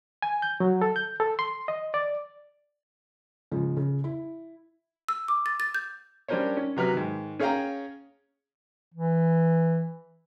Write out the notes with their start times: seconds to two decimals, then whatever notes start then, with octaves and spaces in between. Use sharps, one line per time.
0.22 G#5
0.42 G6
0.60 F#3
0.82 A4
0.96 G6
1.20 A4
1.39 C6
1.68 D#5
1.94 D5
3.52 G#2 C#3 F3
3.77 C#3
4.04 E4
5.08 E6
5.28 D6
5.46 A6
5.60 A6
5.75 G6
6.28 G3 C#4 D4 A#4 C5 C#5
6.57 C#4
6.77 C3 F#3 B4 F6
6.93 G#2 D#3
7.40 C#4 G#4 C#5 F5 G5 A#5
8.94 E3